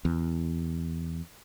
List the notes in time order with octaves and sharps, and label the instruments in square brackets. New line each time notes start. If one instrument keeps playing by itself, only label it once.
[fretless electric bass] E2